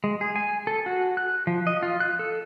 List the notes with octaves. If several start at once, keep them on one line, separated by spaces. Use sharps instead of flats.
G#3
G#4
G#5
A4
F#4
F#6
F3
D#5
F4
F#6
A4